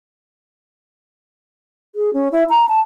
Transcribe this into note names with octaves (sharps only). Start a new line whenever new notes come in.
G#4
C#4
E4
A#5
A5